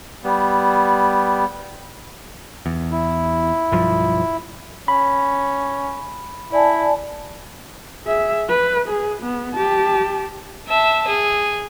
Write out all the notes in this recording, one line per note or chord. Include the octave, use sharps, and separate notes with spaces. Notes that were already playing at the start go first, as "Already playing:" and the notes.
G3 B3
E2
E4
B1 G2 F3
C#4 B5
E4 D5 G#5 A5
G#4 E5
B4
G#4
B3
G4 A5
E5 A5
G#4